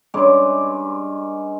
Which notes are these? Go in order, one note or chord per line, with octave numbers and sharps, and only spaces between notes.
G2 G#3 C#4 D6